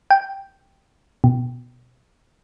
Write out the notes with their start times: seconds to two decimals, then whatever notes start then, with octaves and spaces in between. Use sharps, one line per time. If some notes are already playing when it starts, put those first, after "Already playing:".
0.10 G5
1.24 B2